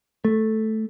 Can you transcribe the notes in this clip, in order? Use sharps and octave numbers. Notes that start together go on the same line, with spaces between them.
A3